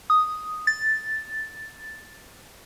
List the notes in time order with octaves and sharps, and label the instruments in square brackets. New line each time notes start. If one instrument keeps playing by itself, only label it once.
[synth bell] D#6
A6